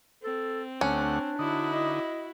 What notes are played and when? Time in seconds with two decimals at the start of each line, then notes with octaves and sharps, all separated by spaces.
0.23 C4 A4
0.81 D2 A3 C#4 D4 F#5
1.39 D3 D#4 E4 F#4
1.73 D#5